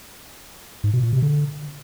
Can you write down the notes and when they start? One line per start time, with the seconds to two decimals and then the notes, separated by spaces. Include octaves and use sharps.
0.84 G#2
0.93 B2
1.03 A#2
1.13 C3
1.22 D3